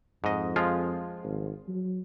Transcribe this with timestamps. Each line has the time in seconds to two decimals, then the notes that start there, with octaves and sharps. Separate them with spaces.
0.24 F2 G#2 D#5
0.56 F3 G#3 F4
1.23 G#1
1.68 F#3